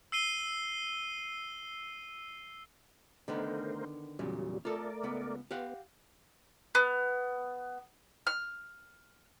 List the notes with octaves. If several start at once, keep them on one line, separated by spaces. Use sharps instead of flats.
E6 C7 D#7 G7
D3 D#3 A3 B3 A#4 C5
E2 A#2 C#3 F#3 G3
A3 F4 A4 A#4 D5
C#2 B3
B3 G4 F5 F#5
B3
F6